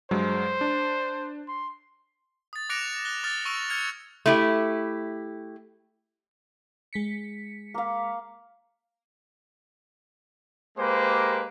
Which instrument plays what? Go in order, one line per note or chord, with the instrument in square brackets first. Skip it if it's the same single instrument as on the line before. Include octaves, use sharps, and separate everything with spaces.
[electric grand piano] G2 F#3 G#3 [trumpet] C5
[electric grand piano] D4
[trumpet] C6
[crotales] D#6 A6
D6 F#6 A#6 C#7 D7 F7
F#6 G7
D6 D#6 F6 A6
C#6 E6 D7 F7 G7
F6 G#6 C#7 F7
[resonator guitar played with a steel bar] A3 E4 G4
[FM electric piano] G#3 B6 C#7
[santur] A#3 F5
[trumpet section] G#3 A#3 G4 B4 C5